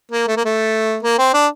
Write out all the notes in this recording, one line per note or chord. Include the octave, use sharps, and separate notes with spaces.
A#3
A3
A#3
A3
A#3
C4
D4